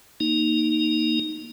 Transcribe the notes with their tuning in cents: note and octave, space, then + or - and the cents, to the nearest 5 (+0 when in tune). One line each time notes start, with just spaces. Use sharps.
A#3 +0 D#4 +0